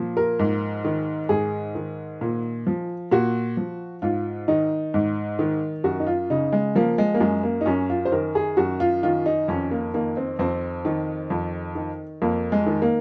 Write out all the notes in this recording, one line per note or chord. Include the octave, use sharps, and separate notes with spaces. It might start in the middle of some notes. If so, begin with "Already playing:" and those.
Already playing: A#2 F3
A#4
G#2
D#3
G#2 G#4
D#3
A#2
F3
A#2 F#4
F3
G#2 F4
D#3 D#4
G#2
D#3
F#2 F#4
D#4
F4
C#3 D#4
G#3
F3 A#3
G#3
A#3
F#2 G#3
A#3
D#4
F#2 C#4
F4
C5
D#3 A#4
G#4
F#2 F#4
F4
D#3 F4
D#4
F2 C#4
A#3
D#3 A#3
C4
F2 C4
D#3
F2
D#3
F2 A#3
G#3
D#3
A#3